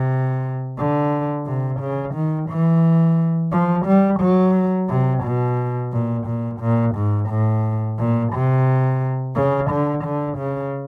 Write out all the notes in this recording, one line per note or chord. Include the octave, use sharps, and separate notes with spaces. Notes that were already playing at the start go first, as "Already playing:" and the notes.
Already playing: C3
D3
C3
C#3
D#3
E3
F3
G3
F#3
C3
B2
A#2
A#2
A#2
G#2
A2
A#2
C3
C#3
D3
D3
C#3